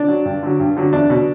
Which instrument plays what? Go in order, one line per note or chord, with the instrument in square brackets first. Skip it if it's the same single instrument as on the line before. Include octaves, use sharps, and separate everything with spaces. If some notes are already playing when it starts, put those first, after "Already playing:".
Already playing: [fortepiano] D4
F#3
G2
D3 F#3
G2
D3 F#3
E2 D4
B2 F#3